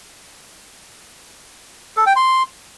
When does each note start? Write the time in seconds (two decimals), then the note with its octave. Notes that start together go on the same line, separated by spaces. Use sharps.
1.97 A4
2.07 G5
2.16 C6